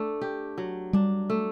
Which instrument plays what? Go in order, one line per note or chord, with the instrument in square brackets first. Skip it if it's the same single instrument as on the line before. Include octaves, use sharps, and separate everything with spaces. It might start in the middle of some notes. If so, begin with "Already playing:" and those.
Already playing: [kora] A3 D4
G4
F#3
[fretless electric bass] G3 [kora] D4
[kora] A3